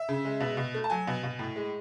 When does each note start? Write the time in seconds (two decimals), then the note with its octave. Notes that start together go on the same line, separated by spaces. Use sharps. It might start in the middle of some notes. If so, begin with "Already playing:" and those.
Already playing: E5
0.09 C#3
0.25 G#3
0.40 B2
0.57 B2
0.75 A3
0.84 A5
0.90 F#3 G#5
1.07 B2
1.23 B2
1.39 A2
1.56 G#3